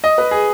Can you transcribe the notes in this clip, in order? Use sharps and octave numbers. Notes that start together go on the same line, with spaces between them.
D#5
B4
G#4